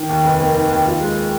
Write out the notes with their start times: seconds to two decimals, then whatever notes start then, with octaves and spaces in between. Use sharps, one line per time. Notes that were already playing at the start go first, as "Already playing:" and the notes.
Already playing: D#3
0.09 D#2
0.24 F1
0.39 A#3
0.55 D#3
0.70 D#2
0.85 F4
1.01 G#3